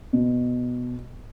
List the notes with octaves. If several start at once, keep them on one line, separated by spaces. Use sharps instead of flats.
B2